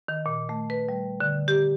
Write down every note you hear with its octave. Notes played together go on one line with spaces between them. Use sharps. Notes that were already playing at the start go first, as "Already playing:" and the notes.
D#3
A#2
A3
B4
G3
D3
G4